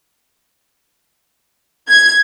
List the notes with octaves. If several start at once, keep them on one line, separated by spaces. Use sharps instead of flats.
G#6